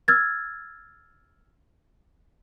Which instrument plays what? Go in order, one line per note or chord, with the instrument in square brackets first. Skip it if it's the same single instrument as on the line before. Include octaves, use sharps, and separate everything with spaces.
[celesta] E6 F6 G#6 A6